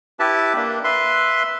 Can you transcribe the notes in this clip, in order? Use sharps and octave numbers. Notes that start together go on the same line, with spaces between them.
E4 G4 B4 E5 A5
A#3 D4
B4 E5 C6